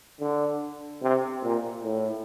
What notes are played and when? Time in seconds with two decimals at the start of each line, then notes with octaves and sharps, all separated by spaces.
0.20 D3
1.02 C3
1.43 A#2
1.84 A2